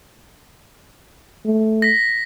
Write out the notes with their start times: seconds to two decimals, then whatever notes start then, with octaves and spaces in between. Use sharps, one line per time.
1.45 A3
1.82 A#6 B6